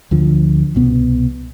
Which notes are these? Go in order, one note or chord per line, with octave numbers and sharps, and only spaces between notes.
D2 D3 F3
C2 B2 B3